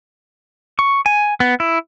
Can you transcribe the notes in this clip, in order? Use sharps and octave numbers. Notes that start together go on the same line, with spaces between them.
C#6
G#5
B3
E4